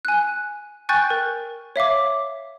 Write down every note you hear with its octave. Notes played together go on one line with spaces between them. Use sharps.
G#5 F#6
G5 G#5 C#6 F#6 G6 A6
A#4
C#5 E5 F5 D6